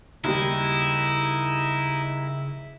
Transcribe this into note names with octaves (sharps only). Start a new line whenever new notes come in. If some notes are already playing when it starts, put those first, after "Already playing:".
D#2 C#3 G3 D#4 E4 D#5